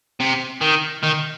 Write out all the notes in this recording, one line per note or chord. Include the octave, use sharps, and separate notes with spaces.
C3
D#3
D#3